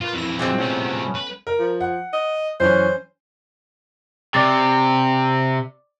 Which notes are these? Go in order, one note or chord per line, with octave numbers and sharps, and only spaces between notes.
A#2 F4 B4
F2 E3 E4 A#6
A#2 G#3 C4 F#4
A2 C3 A3 B3 C#4
B4
A#4
F3
F#5
D#5
F#2 E3 C#4 C5
C3 D5 D6 A6